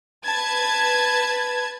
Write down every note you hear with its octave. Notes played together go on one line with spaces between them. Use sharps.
B4 A5 G#6